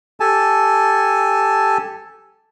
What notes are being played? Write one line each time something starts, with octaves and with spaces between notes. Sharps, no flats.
G4 A4 G#5 A5